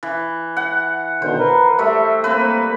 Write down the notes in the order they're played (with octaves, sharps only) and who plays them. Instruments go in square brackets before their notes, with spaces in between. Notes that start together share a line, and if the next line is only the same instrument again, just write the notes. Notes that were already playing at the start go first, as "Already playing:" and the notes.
[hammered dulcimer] E3
F#5
[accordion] B2 D3 D#3 [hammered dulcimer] C5
[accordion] A#4 B4
[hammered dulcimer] G3 A3 [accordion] E5
[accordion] A#3 [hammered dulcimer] C4 B4